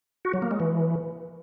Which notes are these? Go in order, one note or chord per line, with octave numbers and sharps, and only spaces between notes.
F#4
F#3
A#3
G#3
E3